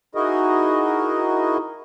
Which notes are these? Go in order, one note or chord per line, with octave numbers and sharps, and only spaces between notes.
D#4 E4 F#4 G#4 A#4 D#5